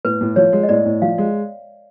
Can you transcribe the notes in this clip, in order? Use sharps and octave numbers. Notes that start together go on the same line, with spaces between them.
A2 B4
A2
F3 C#5
G#3
D#5
A2 D5
A2
F3 F5
G#3